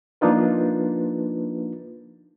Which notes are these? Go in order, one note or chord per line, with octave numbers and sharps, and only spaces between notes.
F3 A#3 D4 D#4 F4 B4